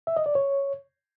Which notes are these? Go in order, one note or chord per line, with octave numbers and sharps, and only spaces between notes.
E5
D#5
D5
C#5